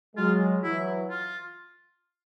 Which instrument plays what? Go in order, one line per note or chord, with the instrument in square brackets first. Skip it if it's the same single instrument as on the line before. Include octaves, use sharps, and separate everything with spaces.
[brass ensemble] F#3 G#3 [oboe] F4
[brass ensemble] E3 F#3 [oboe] E4
[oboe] F4